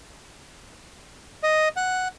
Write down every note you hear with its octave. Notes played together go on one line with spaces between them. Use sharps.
D#5
F#5